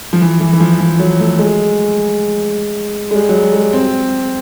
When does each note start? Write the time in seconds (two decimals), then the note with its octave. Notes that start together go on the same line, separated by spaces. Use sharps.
0.13 F3
0.21 E3
0.40 E3
0.53 E3
0.60 F3
0.80 F3
0.99 F#3
1.19 A3
1.38 G#3
3.11 G#3
3.15 G3
3.29 F#3
3.35 G3
3.54 G#3
3.73 C4